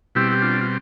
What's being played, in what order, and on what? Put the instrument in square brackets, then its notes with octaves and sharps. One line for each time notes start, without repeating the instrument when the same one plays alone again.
[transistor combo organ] B2 G3 C4 E4 G4
G4
D4 F4
F4